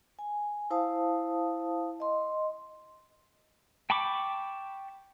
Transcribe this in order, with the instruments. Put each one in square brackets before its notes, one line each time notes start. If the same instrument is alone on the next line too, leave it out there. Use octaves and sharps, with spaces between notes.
[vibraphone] G#5
E4 C5 F5 A5 D#6
D#5 C6
[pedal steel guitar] G5 A5 B5 C#6 D6